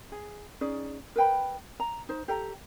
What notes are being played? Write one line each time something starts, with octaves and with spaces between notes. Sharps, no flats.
G#4
C#4 D#4 G#4 D5
A#4 B4 G5 B5
A#5
D#4 C5
G4 A4 G5 A#5